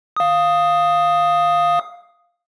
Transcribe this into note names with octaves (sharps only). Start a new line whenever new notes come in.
F5 D#6